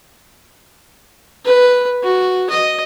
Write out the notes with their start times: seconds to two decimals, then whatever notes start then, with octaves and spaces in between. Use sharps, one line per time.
1.45 B4
2.03 F#4
2.50 D#5